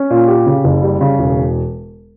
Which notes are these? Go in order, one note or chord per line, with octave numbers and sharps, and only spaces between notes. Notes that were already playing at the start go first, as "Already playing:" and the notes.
Already playing: C#4
A#2
G4
C#3
F#1
G3
C#3
E1